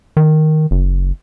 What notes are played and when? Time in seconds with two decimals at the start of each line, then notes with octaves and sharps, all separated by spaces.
0.17 D#3
0.71 F#1